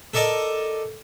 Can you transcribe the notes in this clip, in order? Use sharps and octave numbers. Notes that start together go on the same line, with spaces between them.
A4 A#4 D5 D#5 A5